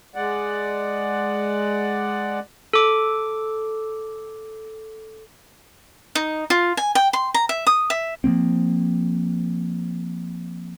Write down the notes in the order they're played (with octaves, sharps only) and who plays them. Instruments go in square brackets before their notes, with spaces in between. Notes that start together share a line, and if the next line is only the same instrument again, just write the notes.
[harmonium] G#3 D5 F#5
[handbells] A4 D6
[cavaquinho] D#4
F4
G#5
G5
C6
A#5
E5
D#6
E5
[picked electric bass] F3 F#3 A#3 C4